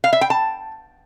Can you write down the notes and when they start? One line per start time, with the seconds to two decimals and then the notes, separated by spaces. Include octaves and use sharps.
0.04 F5
0.13 E5
0.21 G5
0.30 A5